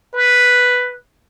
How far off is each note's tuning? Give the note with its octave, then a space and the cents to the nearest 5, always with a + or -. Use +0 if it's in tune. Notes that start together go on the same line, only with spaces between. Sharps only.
B4 +0